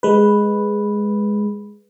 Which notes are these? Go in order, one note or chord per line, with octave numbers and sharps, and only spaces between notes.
G#3 B4